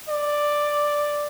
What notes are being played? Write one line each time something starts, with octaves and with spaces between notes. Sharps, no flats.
D5